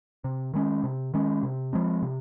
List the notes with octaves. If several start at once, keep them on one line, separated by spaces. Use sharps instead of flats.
C3
D#3 G#3 C#4
C3
D#3 G#3 C#4
C3
F3 G#3 C4
C3